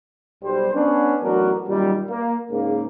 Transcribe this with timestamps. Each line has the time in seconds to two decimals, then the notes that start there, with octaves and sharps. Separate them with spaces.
0.43 B1 G3 C5
0.74 B3 C#4 D4
1.22 A1 F#3 B3 D4 F#4 A#4
1.68 F#2 A#2 D#3 G3
2.09 A#3
2.51 G#2 C#3 A#3